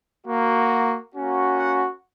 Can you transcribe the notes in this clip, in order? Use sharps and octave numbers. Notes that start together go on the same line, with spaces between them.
A#3 F#4
A#3 C#4 F#4
F#5